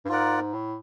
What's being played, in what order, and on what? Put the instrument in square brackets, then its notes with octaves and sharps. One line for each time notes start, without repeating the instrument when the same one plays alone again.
[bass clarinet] G2
[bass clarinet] G#2 [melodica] F4 A#4 D5 F#5
[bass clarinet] A2